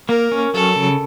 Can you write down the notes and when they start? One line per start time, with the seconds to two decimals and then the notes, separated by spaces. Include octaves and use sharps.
0.09 A#3 A#4
0.32 C#4
0.54 F#3 A4
0.76 C#3